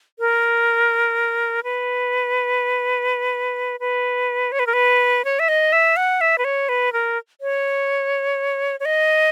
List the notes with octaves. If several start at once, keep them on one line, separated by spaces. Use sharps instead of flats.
A#4
B4
B4
C#5
B4
A#4
B4
C#5
E5
D#5
E5
F#5
E5
B4
C#5
B4
A#4
C#5
C#5
D#5